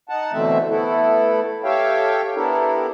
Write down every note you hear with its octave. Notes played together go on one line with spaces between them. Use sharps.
D#4 F#5 A5
B2 D3 E3 A3 C4 E5
A3 B3 E4 A4
G4 A4 C#5 E5 F5 G5
B3 D4 E4 G4 A4 A#4